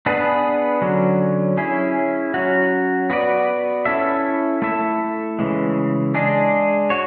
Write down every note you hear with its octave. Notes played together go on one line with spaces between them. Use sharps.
B3 D4 G#4 B4
D3 F#3 C#4
C#4 E4 G#4
F#3 C#4 F#4
B3 F#4 B4 D5
C#4 E4 A4 E5
A3 E4 A4 E5
C#3 E3 G#3
G#3 D4 G#4
F#4 C#5